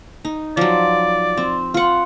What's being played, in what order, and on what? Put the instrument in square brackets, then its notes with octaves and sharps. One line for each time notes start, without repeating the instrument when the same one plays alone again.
[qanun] D#4
[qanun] F3 F#3 [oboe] D5
[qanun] C4
F4 F#5